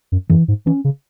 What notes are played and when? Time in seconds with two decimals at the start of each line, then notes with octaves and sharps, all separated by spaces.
0.12 F#2
0.30 F#2 E3
0.48 G#2
0.66 E3 C#4
0.84 C#3